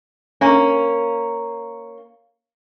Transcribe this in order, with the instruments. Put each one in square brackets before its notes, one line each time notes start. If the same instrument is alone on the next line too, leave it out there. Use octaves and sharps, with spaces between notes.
[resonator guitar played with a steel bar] A#3 C#4